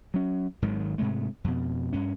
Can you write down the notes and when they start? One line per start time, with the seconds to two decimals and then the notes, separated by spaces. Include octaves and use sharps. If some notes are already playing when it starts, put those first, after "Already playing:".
0.14 F#3 C#4
0.62 G#1 G#2 D#3 F#3
0.98 G#2 C3 G#3 A3
1.44 F2 B2
1.93 G2 C#4